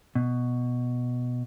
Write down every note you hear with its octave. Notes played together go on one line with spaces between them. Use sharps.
B2